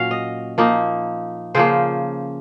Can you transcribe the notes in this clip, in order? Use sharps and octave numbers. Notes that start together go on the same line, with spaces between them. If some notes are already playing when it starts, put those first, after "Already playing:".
Already playing: A#2 F#3 C#4 F5
D#5
F3 A#3 D#4
C#3 F3 A#3 C5